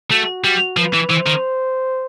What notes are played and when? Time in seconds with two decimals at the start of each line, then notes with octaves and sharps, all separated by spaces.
0.11 A3 F#4
0.44 G3 F#4
0.77 F3 B4
0.93 E3
1.09 E3 C5
1.26 D#3